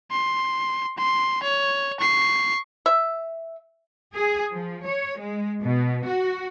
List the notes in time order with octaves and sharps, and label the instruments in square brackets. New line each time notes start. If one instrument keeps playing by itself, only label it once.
[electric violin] C6
C6
C#5
C#6 C7
[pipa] E5
[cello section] G#4
F3
C#5
G#3
B2
F#4